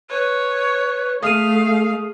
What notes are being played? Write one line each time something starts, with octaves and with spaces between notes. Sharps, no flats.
B4 C#5
A3 G#4 F5 D#6 F6 D#7